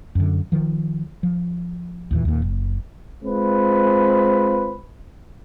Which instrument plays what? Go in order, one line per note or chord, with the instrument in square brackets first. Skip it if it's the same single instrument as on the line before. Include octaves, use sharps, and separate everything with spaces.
[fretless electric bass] F#2 D3
D#3 F3
F3
D#2 A#2 E3
D#2 A#2
F#1
[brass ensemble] G#3 C4 F4 B4